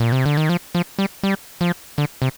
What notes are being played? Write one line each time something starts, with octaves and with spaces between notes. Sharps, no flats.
A#2
C3
D3
D#3
F3
F3
G3
G3
F3
D3
C3